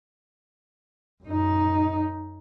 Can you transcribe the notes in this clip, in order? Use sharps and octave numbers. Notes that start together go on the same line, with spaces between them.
F#2 D#4